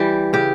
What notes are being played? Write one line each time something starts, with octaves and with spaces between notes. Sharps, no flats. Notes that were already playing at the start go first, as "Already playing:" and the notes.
Already playing: E3 G3 G4
C#3 G4